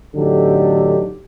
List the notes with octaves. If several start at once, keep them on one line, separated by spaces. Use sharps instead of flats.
A1 D3 F#3 D#4 G4 A4